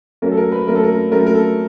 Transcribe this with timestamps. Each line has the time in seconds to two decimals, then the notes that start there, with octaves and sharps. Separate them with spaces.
0.22 F#3 A3 C#4 A#4
0.31 A4
0.37 A#4
0.52 B4
0.67 F#3 A3 C#4 A#4
0.75 A4
0.84 A#4
1.11 F#3 A3 C#4 A#4
1.26 A#4
1.34 A4